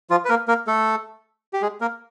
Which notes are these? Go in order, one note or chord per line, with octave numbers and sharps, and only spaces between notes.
F3 F4
B4
A#3 A#4
A#3 A#4
A3 A4
G4
G#3 G#4
A#3 A#4